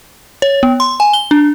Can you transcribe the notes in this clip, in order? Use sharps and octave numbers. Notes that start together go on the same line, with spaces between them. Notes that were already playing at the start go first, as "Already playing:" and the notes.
C#5
B3
C6
G#5
G7
D4